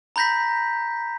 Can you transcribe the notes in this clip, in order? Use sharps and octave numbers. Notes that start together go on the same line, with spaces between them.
A#5 B5 G6 A#6 B6